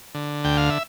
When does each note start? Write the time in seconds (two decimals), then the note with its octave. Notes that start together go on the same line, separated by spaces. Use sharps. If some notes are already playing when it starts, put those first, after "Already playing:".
0.15 D3
0.44 D2 G5
0.57 F5
0.70 E5